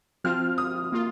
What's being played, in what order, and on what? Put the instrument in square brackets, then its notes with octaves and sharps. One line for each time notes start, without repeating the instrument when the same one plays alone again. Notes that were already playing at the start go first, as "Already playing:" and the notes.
[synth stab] F3 C4 F4 [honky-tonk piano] F6
[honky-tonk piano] D#6
[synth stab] A#3 F4